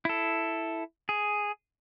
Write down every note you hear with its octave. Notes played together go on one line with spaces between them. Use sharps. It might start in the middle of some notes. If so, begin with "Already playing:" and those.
E4 A4
G#4